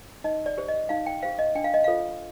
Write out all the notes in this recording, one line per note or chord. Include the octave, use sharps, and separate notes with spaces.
D#4 D#5
D5
G4 C5
D#5
D#4 F5
G5
G4 C5 F5
D#5
D4 G5
F5
D#5
F4 A4 C5 F5